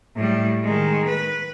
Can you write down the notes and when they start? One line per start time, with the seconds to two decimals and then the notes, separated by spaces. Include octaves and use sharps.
0.16 A2 G3
0.63 D#3 G#3
1.08 B4